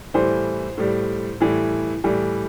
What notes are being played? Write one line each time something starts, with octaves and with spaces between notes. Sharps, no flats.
A2 E3 G3 C5
A2 G3
A2 E3 G3
A2 E3 G3